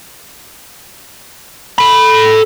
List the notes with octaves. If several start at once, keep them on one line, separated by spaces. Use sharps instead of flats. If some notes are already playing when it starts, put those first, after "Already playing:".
A4 B5